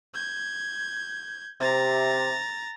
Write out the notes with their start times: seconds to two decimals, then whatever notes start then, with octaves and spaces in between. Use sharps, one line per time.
0.14 G6 G#6
1.60 C3 A#5 A6